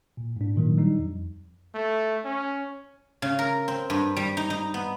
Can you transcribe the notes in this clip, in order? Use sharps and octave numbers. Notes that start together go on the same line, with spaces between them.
A#2
G#2 D4
A#2 D#3 F#3
G3 D4 D#4
F2
A3
C#4
C#3
A#4
C4
G2
G3
D#4
D#4
B3